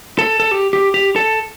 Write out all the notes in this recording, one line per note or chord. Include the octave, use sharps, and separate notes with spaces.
A4
A4
G4
G4
G4
A4